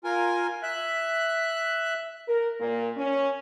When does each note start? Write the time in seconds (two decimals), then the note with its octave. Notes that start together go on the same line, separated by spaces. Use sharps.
0.04 F4 A#4 G#5
0.63 E5 F#6
2.28 A#4
2.60 A#2
2.96 C#4